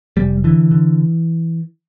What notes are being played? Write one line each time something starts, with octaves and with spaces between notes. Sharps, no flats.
F1 G3
D3 E3
D3